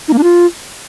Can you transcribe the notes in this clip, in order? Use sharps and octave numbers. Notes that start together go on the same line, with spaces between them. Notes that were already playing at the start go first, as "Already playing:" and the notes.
D#4
A#3
D4
F4